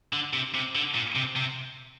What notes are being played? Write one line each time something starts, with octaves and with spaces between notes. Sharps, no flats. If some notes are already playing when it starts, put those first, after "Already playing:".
D3
C3
C3
D3
A#2
C3
C3